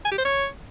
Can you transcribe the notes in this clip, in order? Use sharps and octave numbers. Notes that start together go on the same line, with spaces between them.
G#5
G4
C5
C#5